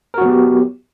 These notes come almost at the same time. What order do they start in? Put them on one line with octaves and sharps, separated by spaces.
A#4 F#4 F#3 B3 G4